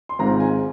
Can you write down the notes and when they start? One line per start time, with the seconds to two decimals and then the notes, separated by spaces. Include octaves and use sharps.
0.09 C6
0.19 G#1 G#2 G#3 C4 F4 A#5
0.40 G#5